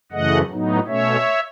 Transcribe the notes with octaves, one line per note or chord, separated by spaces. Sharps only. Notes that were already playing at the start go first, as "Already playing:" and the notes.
F#2 C#3 E3 A3 D#5 F#5
A2 F#3 B3 D#4
B2 A3 C#4 C#5 E5